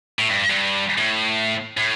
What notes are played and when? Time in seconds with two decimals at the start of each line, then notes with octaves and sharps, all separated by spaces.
0.19 A2
0.29 G2
0.50 G2
0.98 A2
1.77 A2